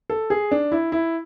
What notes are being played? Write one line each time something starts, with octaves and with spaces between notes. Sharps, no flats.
A4
G#4
D4
E4
E4